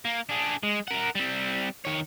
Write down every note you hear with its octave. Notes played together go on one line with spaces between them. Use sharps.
A#3
D4 G#4
G#3
A#4 F#5
G3 C4
D#3 C#5